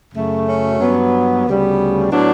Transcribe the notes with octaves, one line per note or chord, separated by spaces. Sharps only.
F#2 C#3 F#3 A3
C#4
G2 F#3 B3
D2 C#3 G3 B3
A2 F#3 B3 D4